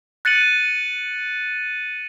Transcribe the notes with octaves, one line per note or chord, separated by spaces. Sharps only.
F#6 A6 C#7 D#7 F#7